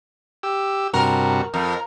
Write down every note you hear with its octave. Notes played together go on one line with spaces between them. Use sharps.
G4 E6
G2 C3 F#4 A#4
F2 A#4